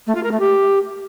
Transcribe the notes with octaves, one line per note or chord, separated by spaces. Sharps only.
A3
F4
A#4
A3
G4